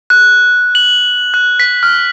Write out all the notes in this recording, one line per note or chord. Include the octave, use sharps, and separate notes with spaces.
F#6
F#7
F#6
B6
F6